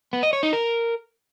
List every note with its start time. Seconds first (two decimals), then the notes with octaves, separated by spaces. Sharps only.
0.13 B3
0.23 D#5
0.33 C#5
0.43 D#4
0.53 A#4